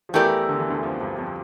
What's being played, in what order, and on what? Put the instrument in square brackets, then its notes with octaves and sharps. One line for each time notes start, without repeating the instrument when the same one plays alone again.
[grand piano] F3
[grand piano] E2 E3 [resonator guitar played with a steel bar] A3 E4 G4 A#4 D5
[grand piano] D3
E3
D2 D3
F2 F3
G2 G3
F2 F3